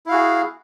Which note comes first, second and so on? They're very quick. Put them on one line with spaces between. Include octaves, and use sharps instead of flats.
E4 F5 F#4 G#4